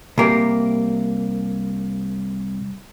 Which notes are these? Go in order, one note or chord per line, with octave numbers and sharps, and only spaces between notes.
C2 A#3 G4